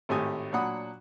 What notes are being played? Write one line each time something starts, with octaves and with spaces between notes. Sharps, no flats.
G#1 A2 A3 G4 G#5 D#6
A#2 F#3 D4 F#5 B5 D#6